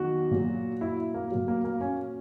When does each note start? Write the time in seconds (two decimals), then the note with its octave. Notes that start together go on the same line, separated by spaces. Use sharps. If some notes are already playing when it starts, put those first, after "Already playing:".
Already playing: E2 D#3 F#3 F#4
0.31 A#2 F#3
0.81 E4
1.14 A#3
1.31 A#2 F#3
1.48 A#3
1.65 A#3
1.81 C#4